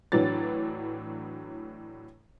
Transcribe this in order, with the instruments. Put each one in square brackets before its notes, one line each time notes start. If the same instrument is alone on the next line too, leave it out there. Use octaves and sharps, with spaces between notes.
[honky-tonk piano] A2 E3 F#3 D4 A6